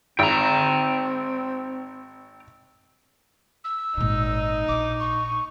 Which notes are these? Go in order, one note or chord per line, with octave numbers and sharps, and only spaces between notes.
G#1 C4 G5 A#5
E6
G#1 A#2 D#4
A#1 D6
C#6